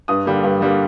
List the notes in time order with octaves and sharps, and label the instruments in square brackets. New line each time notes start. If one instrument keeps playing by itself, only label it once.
[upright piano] G2 D#6
D3 G3 A#3
G2
D3 G3 A#3